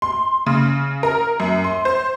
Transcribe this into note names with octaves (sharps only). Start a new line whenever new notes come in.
C6
C#3
A#4
F#2
C6
C5